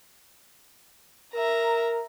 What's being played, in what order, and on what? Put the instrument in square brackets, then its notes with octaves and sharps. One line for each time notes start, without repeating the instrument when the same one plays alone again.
[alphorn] A#4 [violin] E5 A#5